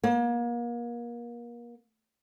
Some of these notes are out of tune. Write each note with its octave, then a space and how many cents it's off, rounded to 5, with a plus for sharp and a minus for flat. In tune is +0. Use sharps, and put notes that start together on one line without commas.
A#3 +35